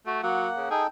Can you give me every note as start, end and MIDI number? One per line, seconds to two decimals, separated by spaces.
0.06 0.18 57
0.06 0.21 66
0.23 0.47 54
0.23 0.69 58
0.23 0.69 78
0.56 0.70 49
0.70 0.87 63
0.70 0.83 68
0.70 0.87 69
0.70 0.87 79